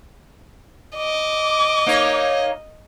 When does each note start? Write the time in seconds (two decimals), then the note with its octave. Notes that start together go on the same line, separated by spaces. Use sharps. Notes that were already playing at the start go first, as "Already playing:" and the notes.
0.97 D#5 D6
1.86 A#3 D#4 C#5